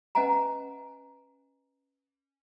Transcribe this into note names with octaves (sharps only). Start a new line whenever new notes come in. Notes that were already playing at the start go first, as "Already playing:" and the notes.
C#4 B4 D#5 F#5 G#5 A#5